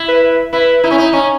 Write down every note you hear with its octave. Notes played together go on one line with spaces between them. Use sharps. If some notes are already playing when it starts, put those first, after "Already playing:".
Already playing: E4
B4
B4
E4 B4
D#4 E4
C#4
D#4
C#4 D#4